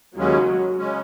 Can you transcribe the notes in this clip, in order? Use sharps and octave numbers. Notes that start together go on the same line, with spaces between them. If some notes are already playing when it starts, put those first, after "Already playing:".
D#2 C#3 F#3 G#3 C#4
C#3 G#3 C#4